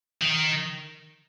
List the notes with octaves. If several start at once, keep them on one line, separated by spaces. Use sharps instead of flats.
D#3